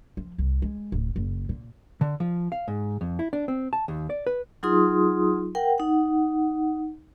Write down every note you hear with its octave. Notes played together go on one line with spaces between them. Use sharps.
F3
C2
G#3
D1
F#1
A#2
D3
F3
F5
G#2
F2
E4
D4
C4
A5
D#2
D5
B4
F#3 D#4 F4 G#4 C6 D#6
A#4 F#5 G5
D#4 F#5